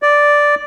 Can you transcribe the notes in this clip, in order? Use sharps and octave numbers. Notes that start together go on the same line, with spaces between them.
D5